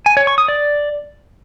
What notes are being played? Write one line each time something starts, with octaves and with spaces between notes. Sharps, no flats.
G#5
C#5
C#6
D#6
D5